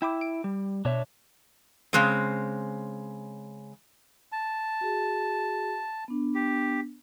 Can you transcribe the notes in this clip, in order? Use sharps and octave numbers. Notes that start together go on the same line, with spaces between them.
E4 G5 B5 D6
D7
G3
B2 D4 C#5 E5
C#3 G#3 C4
A5
F#4 G#4
B3 D4
G4